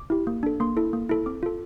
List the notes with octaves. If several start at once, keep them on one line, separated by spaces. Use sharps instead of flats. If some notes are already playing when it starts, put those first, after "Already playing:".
Already playing: D6
E4 G4
A#3
D4 A4
A#3 C6
E4 A4
A#3
E4 A4
C4 D6
F4 A4